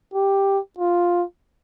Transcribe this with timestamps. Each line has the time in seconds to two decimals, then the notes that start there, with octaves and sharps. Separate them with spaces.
0.14 G4
0.79 F4